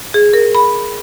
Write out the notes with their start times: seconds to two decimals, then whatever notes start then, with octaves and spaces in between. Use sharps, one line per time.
0.14 G#4
0.34 A#4
0.55 B5